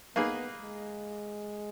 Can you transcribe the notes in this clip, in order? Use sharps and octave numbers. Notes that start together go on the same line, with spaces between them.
A#3 B3 D#4 G#4 B4
G#3